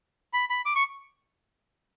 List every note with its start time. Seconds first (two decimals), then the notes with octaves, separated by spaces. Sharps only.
0.33 B5
0.50 B5
0.66 D6
0.76 C#6